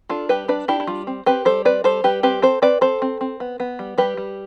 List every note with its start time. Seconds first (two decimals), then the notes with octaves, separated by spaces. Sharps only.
0.09 D4 F4 A4
0.29 G3 G4 B4
0.48 D4 B4 D5
0.68 D4 E4 G4
0.80 E4
0.87 G3 F4
1.07 C4
1.26 C4 G4 B4
1.45 G3 A4 C5
1.65 C4 B4 D5
1.84 G3 A4 C5
2.04 G3 G4 B4
2.23 C4 G4 B4
2.42 C4 A4 C5
2.62 C4 B4 D5
2.81 C4 A4 C5
3.02 C4
3.21 C4
3.40 B3
3.60 B3
3.79 G3
3.98 G3 G4 B4
4.17 G3